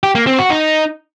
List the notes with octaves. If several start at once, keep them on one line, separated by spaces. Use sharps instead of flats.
G4
A#3
C4
F#4
D#4